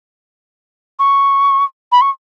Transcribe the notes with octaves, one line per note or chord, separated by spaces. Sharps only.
C#6
B5
C#6